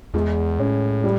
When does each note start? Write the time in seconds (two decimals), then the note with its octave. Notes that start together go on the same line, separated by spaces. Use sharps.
0.14 E2 G#3
0.59 A2 C#4
1.04 G3